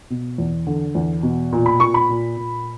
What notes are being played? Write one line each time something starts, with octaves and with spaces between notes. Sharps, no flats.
B2
E2
D3
E2
B2
A#2
B5
A#2 C#6
B5
A#2
A#2